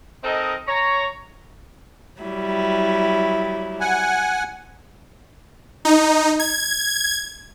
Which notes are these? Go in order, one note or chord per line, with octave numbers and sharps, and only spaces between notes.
C4 D#4 A4 A#4 D#5
C#5 A#5
F#3 G3 E4
F#5 G#5
D#4
G#6